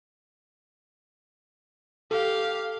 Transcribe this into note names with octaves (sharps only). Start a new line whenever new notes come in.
G4 A4 F5